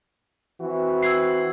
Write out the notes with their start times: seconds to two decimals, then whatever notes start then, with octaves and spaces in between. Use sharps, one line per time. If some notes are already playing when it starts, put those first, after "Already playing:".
0.61 E3 C4 F#4
1.03 E6 G#6 C7